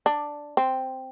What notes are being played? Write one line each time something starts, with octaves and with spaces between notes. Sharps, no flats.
D4
C4